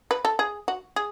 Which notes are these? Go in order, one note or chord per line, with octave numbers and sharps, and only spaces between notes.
B4
A4
G#4
F#4
G#4